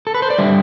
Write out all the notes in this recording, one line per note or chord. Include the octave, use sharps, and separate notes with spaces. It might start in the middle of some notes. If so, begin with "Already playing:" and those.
A4
B4
C5
D5
D3 G3 E5